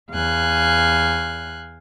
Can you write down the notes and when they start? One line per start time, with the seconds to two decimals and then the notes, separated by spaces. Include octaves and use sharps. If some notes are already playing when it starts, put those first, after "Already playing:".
0.12 E2 F5 G#5 F#6